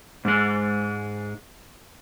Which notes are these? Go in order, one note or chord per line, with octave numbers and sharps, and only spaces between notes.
G#2 G#3